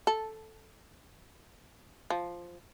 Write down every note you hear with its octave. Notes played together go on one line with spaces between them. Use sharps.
A4
F3